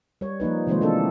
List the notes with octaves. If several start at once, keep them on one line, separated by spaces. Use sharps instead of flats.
G3 C#5
F3 A#3 D#4 B4
C3 D#3 F3 G#3 A#3 C5
E3 A3 C4 D4 D#4 A4